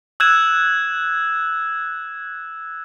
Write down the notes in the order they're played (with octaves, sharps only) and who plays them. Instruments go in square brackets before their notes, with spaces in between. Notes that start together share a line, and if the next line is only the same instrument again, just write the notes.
[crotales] E6 F#6 G#6 E7